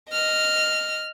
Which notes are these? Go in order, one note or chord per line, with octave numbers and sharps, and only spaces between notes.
D#5 F6